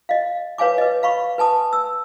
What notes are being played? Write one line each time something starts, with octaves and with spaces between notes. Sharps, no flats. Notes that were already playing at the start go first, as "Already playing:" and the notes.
D#5 F5
B4 C#5 F5 G#5 D6
B4 D#5
F5 B5 C#6
B4 G#5 A5 D#6
E6